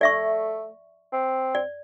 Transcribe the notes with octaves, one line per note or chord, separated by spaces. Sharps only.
A3 D5 E5 C#6
C4
D5